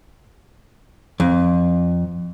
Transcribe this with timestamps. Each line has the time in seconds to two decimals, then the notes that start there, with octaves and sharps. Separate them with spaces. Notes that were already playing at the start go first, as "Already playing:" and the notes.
1.20 F2